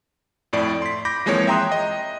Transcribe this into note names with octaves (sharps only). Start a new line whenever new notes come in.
F2 A2 D5
C6 B6
B5 D6 G6 A#6
E3 F3 G#3 A#3 C4 C#5
E5 G5 A#5 C6 D#6 F#6
D#5